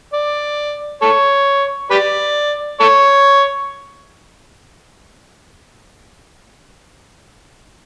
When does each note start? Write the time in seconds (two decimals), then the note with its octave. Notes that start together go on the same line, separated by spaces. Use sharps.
0.13 D5
1.02 A4 C#5
1.91 G4 B4 D5
2.80 A4 C#5